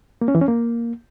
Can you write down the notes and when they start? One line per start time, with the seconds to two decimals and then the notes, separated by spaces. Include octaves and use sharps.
0.21 A#3
0.28 C#4
0.35 E3
0.41 C#4
0.48 A#3